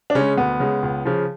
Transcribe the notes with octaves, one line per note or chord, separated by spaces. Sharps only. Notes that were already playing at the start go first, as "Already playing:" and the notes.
D4
C#3 G#3 C#4
D2 B3
C#3 G#3
C#2
C#3 F3